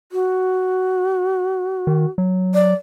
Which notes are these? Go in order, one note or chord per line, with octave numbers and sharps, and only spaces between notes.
F#4
D#3
F#3
D5